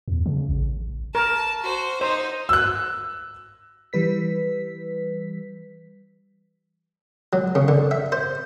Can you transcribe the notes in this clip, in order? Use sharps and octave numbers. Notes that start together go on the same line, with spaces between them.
E2
C#3
A1
A#4 A5
F#4 C5
D#4 C5
E6 F#6
E3 G3 B4 B6
F#3
C#3
D3
E5
C5